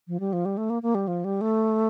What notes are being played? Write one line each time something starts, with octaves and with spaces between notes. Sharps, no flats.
F3
G3
F3
G3
A3
A#3
A#3
G3
F3
G3
A3